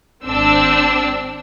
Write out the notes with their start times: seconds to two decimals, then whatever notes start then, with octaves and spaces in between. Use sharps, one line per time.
0.25 G#1 C4 D4 E6